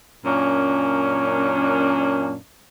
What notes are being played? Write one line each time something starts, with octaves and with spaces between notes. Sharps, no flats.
F#2 A#2 A#3 C#4 D4